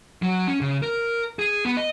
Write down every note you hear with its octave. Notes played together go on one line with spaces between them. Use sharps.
F#3
C#4
C#3
A#4
G#4
B3
D#5